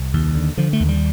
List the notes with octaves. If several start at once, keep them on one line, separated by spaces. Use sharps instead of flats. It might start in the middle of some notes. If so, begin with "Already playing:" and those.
Already playing: C2
D#2
D3
D3 F3
A3
D#2
G3